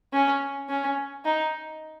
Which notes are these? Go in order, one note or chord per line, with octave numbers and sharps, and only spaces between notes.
C#4
C#4
D#4